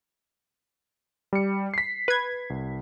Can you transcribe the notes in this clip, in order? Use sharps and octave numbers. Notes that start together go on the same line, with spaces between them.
G3 C#7
B6 C7
B4 G#6
C2